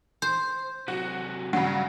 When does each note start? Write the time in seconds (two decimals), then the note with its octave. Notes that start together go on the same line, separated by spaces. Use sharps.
0.22 C5
0.88 C3 F#3 F#4
1.53 G2 C#3 F#3 F#5